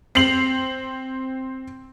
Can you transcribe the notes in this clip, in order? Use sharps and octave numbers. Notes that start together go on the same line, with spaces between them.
C4 C7 F7 F#7